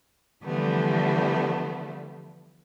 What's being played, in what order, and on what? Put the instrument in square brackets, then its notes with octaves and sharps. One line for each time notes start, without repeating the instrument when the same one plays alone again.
[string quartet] D3 E3 F3 G3 A3 B3